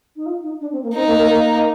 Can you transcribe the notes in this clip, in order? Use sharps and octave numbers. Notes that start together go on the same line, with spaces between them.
D#4
F4
D#4
D4
C4
A#3
C4 D#4
A#3
A#3
A#3